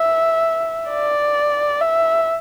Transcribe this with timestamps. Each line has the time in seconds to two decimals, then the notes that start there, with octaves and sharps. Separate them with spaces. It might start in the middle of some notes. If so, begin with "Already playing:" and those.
Already playing: E5
0.90 D5
1.81 E5